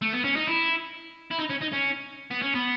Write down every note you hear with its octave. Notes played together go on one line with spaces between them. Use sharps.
A3
B3
C#4
D#4
E4
E4
D#4
C#4
D#4
C#4
B3
C#4
B3